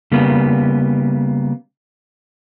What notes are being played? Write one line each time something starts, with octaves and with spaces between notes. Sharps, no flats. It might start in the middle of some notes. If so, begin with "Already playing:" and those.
C#3 G3 A#3 B3